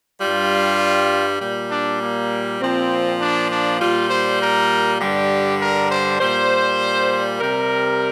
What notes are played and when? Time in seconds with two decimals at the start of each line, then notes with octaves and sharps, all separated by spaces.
0.20 G2 G3 F4
1.40 A#2 G3
1.70 D4
2.01 A#3
2.61 A#2 F3 C4
3.21 D4
3.50 D4
3.81 A#2 G3 F4
4.10 C5
4.41 A#4
5.00 G2 D3 G3 G4
5.61 A#4
5.91 C5
6.21 A#2 G3 C5
7.40 C3 G3 A#4